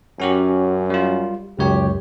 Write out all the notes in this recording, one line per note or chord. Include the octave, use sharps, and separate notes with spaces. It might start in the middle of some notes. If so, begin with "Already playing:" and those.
F#2 C#4 F#4 G4
G3 F4
C#2 F#2 G4 C#5